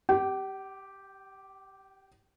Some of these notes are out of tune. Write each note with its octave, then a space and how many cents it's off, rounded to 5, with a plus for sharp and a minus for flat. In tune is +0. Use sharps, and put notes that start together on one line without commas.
G4 -5 G5 -45